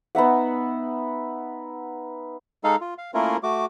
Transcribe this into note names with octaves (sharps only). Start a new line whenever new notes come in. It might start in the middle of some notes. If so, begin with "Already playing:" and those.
B3 D#4 E5 F#5
G#3 D#4 A4 F5
F4
F5
A3 A#3 C#4 E4 F4 A#4
A3 F#4 D6